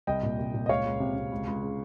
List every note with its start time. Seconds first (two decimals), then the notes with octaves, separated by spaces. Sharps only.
0.07 C2 D#5 G5
0.23 A#2
0.39 C2
0.54 A#2
0.66 D#5
0.69 C#2 C#5 F5
0.85 C#2
1.00 C3
1.16 C3
1.32 C#2
1.47 C#2
1.62 C#3